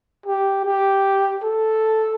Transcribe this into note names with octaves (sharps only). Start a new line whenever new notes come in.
G4
G4
A4